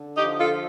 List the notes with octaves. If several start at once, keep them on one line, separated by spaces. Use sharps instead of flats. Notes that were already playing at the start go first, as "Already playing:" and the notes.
Already playing: D3
D#4 G4
F3
F4 A4